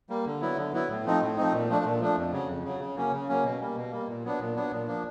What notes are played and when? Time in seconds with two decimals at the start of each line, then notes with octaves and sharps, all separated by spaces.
0.09 G3 A#3
0.26 D3
0.41 F#3 B3 E4
0.57 D3
0.73 F#3 B3 E4
0.89 A2
1.05 F3 A3 C4 D#4
1.21 A2
1.37 F3 A3 C4 D#4
1.52 A#2
1.68 F3 A3 D4
1.85 A#2
2.00 F3 A3 D4
2.17 F2
2.32 C#3 F#3
2.48 F2
2.64 C#3 F#3
2.80 C#3
2.96 F#3 A#3 C#4
3.12 C#3
3.29 F#3 A#3 C#4
3.44 B2
3.60 G3 A#3
3.76 B2
3.91 G3 A#3
4.08 A#2
4.24 F#3 B3 D4
4.40 A#2
4.56 F#3 B3 D4
4.71 A#2
4.87 F3 A#3 D4